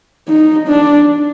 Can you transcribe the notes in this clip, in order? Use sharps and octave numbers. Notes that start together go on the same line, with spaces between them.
D#4
D4